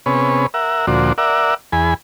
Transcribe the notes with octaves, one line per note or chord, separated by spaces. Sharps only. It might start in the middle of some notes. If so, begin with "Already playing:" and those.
C3 B3 C#4 G#4 B4 C#5
A#4 E5 F#5
D2 A#2 F3 F#4 C5 D5
A#4 D5 E5 F#5
E2 G#4 G#5 B5